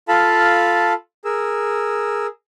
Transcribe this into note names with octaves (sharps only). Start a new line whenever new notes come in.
F4 A4 F5 A5 B5
G#4 A#4 E6